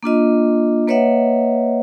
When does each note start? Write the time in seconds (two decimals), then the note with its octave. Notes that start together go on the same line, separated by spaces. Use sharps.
0.03 A#3 D4 F4 D#5
0.88 A#3 B4 C#5 D#5 E5 F#5